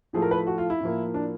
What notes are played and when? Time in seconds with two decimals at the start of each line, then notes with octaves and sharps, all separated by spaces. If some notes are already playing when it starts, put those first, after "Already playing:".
0.13 A2 F3 A3 G#4
0.22 A#4
0.31 B4
0.47 F#4
0.58 F4
0.70 E4
0.81 A2 F3 A#3
1.14 D4